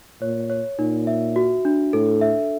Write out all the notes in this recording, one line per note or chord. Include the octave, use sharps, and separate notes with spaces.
A#2 C#5
C#5
A#2 D#4
E5
F#4
D4
A2 A4
E5